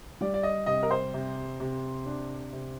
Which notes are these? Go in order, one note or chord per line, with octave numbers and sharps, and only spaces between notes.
G3 D5
D5
D#5
C3 D#5
A#4
C5
C3
C3
D4
C3